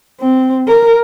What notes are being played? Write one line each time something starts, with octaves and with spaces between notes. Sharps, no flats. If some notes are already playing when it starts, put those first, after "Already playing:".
C4
A#4